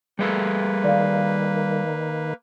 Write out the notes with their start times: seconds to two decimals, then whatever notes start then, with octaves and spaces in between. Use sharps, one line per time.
0.19 G3 A#3 G#4 A4 B4
0.84 D#3 D5 F5